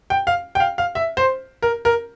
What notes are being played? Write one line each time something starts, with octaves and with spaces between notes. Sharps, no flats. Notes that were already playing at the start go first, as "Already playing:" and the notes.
G5
F5
G5
F5
F5
E5
C5
A#4
A#4